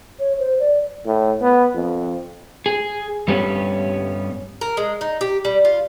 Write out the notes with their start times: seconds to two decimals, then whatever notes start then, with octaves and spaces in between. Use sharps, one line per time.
0.19 C#5
0.39 C5
0.59 D5
1.06 A2
1.41 B3
1.74 F2
2.66 G#4
3.28 G2 G3 B3 C#4 G4
4.61 A#4
4.77 G#3
5.01 D#4
5.21 G4
5.45 G3
5.65 F4